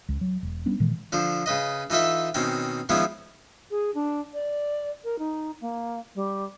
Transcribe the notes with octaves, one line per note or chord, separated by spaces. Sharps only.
C#2
F#3
E1
G3 B3 C#4 D4
A#2 D#3 E3 G#3
D3 F3 C5
C#3 B4 D#5
E3 D#4 F4 A4 E5
B2 D#3 C4 C#4
D#3 F3 G#3 B3 C#4 E4
G#4
D4
D5
A#4
D#4
A#3
G3